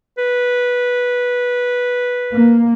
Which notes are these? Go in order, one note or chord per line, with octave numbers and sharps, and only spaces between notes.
B4
A#3